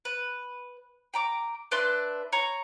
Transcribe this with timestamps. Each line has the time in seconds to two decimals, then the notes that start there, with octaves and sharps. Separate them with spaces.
0.05 B4
1.14 G5 A#5 D6
1.71 D4 B4 E5 C6
2.33 C#5 A#5